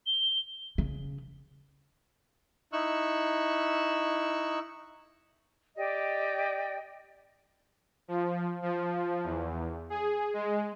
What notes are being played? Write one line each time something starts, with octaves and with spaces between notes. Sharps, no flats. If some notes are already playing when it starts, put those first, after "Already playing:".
G7
C#3
D#4 E4 C#6 E6 F#6
G4 D5 D#5 G5
F3
F3
E2
G#4
G#3